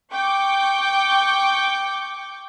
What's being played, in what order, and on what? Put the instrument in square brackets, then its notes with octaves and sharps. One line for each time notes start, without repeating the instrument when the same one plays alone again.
[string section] G5 C#6 D6 G6